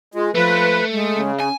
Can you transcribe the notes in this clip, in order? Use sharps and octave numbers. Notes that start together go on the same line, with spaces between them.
G#3 F4
F3 A3 B4
G#3
C#3
C#4 G#5